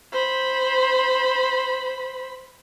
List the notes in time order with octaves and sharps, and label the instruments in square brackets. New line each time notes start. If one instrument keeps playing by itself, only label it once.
[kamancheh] C5 B5